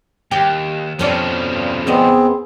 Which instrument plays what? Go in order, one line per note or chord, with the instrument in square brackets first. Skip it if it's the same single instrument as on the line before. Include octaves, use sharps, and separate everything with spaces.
[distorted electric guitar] D#2 [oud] G4
[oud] F2 C#4 D5 [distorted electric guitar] B2 F3
[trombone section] G2
[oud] D#2 D5 D#5 [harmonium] B3 C4 [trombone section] G#4